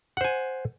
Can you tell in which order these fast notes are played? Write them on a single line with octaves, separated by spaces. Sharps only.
F#5 C5 G#5